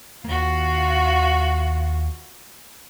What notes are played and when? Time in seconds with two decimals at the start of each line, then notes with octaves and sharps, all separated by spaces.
0.25 D#2 A#3 F4 F#4